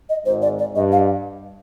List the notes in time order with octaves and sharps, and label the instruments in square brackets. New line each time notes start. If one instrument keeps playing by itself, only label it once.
[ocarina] D#5
[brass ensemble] G#1 G#2 [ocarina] C5
[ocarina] D5
D5
[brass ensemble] G2 [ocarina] D#5
[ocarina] F5